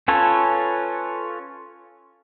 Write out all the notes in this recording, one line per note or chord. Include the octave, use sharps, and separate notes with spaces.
C#4 F4 A4 B4 C#5